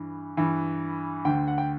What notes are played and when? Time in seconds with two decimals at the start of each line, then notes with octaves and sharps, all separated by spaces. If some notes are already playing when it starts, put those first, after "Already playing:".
Already playing: G2 E3
0.37 G2 E3
1.25 D2 D3 G5
1.48 F#5
1.58 G5